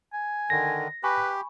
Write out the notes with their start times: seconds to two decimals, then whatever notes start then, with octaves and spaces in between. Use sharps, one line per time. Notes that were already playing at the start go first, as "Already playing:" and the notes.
0.13 G#5
0.50 D3 D#3 A#6
1.04 G4 B4 G#5 B5 C#6